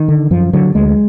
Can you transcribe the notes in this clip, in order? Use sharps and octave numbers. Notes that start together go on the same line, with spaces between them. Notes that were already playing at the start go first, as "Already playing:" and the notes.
Already playing: D#3
D3
F#2 F3
D3 F#3
D2 G#3